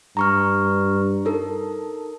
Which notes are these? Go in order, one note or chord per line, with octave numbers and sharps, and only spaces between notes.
G2 A#5 C#6 F6
D#4 A4 A#4